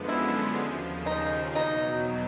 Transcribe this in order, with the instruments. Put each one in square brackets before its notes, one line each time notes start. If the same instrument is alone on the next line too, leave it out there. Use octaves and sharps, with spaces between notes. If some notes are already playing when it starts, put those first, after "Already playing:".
Already playing: [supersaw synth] F#2 D3 F3 G#3 B3
[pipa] E4
[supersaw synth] D#2 C#3 F3
[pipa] D#4
[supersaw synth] E2 B2 F#3 [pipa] D#4